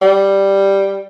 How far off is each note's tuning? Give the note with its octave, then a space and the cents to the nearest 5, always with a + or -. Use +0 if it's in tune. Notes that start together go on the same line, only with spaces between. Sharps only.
G3 +0